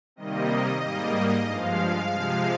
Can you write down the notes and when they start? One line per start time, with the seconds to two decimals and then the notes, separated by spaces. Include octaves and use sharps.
0.16 C3 D#3 G3 A#3 D#5
0.82 G#2 G3 A#3
1.45 G2 F3 G#3 F5
2.11 C3 F3 G#3